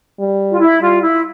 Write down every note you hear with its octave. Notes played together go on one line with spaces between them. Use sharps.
G3
F4
E4
G3 F4
E4